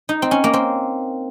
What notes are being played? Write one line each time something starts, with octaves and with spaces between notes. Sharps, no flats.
D#4
C4
C#4
A#3
C4